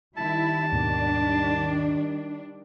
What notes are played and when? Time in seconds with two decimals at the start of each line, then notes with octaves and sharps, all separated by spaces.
0.17 D#3 G3 E4 A5
0.72 D#2 G#2 B2 D4